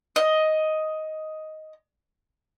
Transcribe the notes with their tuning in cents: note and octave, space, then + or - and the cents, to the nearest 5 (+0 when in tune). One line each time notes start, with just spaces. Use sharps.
D#5 +5